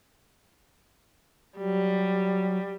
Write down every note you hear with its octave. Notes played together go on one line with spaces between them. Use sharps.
F#3 G3